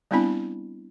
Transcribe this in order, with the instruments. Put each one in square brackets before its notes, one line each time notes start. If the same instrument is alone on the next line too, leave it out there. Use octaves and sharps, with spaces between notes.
[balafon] G3 B3 C4 D4 E4 B5